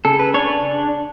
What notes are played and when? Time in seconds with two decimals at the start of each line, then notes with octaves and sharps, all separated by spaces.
0.05 C#3 A4
0.19 B4
0.34 D4 C#5